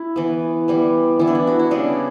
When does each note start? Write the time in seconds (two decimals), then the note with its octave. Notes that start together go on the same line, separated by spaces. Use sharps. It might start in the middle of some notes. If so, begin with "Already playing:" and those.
Already playing: E4
0.16 E3 B3
0.68 E3 G3 B3
1.19 E3 B3 E4
1.28 D4
1.35 E4
1.47 F#4
1.59 E4
1.71 C#3 G3 B3 D4